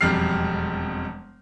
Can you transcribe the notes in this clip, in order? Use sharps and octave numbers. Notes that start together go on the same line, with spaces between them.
E1 F2 G3 F6 C7